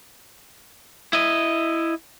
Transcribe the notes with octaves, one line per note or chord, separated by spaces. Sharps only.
E4 D#5